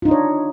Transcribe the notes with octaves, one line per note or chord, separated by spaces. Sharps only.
D4 D#4 F4 C#5